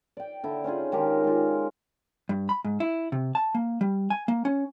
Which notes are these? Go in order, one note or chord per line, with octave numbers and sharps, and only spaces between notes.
D5 G5
D3 E4
C#4 D#4 F4 G#4
D#3 G#3 G4 A#4
G#3 F4
G2
B5
G#2
E4
C3
A5
A#3
G3
G#5
A#3
C#4